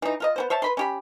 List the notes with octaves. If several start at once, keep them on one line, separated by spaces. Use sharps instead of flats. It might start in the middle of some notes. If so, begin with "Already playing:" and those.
E3 D#4
F4 A#4 D#5
B3 C#4 C5
C5 C#5 E5 A5
B4 B5 C6
C#4 G4 B5